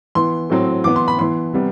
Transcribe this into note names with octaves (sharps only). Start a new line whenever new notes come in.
E3 B3 C6
A2 F#3 C4
E3 B3 D6
C6
B5
E3 B3 C6
C3 G3 B3